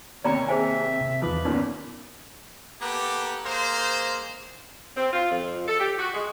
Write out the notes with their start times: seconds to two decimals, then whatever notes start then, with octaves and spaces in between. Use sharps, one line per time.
0.24 D#2 C3 C#5 D5 A#5 B5
0.49 G#4 C5 E5 G#5
1.01 C3
1.22 E2 D#3 F3 B4 D6
1.45 E2 G2 A#2 C#4 D#4
2.82 A#3 B3 G4 A4
3.45 G#3 A#3 C5
4.97 C4
5.13 F4
5.31 F2
5.68 A4
5.80 G4
5.99 F#4
6.14 G#3